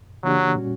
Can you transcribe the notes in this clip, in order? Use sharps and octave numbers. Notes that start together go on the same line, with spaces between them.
C#3 E3 F#3 A#3 D4 G4
A#2 G3 C#4 F#4